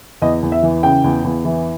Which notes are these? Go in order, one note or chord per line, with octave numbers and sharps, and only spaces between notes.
E2 D#5
E2
E5
E3
C#3 G5
E2
E2
E3